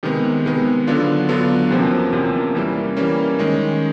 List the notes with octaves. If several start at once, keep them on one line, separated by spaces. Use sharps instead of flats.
C3 D#3 G#3 B3
C3 D#3 G#3 B3
D3 F#3 B3 D4 F4
D3 F#3 B3 D4 F4
E2 C3 F3 A#3 C#4
E2 C3 F3 A#3 C#4
E3 G3 A#3 C#4
E3 G3 A#3 C#4
D#3 G#3 C#4